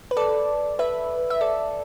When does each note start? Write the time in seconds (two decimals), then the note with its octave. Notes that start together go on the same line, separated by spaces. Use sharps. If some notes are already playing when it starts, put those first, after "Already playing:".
0.11 B4
0.17 A4 D5
0.79 B4 E5
1.30 E5
1.41 A4 D5